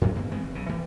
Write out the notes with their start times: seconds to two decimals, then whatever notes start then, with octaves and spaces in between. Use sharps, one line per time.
0.01 A2 C3 F#3 G#3
0.15 D2 G2 B2 A#3
0.31 E3 G#3 B3 C4
0.43 F1
0.55 B1 C#3
0.69 E3 G3 A3 A#3